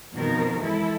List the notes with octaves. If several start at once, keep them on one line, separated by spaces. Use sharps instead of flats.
F2 B2 D#3 F3 A#4
E3 G#3 E4 A4